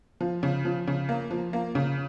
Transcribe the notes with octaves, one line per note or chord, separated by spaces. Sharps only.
F3
C#3
F3
C#3
A#3
F3
A#3
C#3